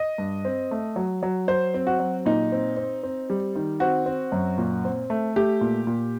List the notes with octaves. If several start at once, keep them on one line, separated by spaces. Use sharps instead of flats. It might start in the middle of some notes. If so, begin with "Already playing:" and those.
Already playing: D#5
G2
C4
A3
F#3
F#3
F#3 C5
C4
F#4
F#3
A#2 D#4
C4
C4
C4
G3
D#3
C4 F#4
C4
F#2
A#2
C4
A3
A3 G4
A#2
A#2